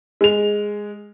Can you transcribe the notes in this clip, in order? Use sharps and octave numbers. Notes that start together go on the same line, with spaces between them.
G#3 F7